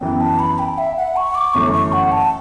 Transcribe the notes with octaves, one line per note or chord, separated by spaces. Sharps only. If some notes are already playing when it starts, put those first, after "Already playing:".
F#2 E3 B3 G5
A5
B5
G5
E5
F#5
C#6
D6
G1 F#2 E3 A3 C#4 C#6
C#6
F#5
A5